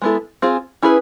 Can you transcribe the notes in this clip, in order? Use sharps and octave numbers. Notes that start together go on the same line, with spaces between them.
G#3 B3 E4 A4
C4 F4 G#4
C#4 E4 G#4 B4